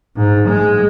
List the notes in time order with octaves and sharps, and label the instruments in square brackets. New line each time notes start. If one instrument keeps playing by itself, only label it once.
[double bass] G#2
G#3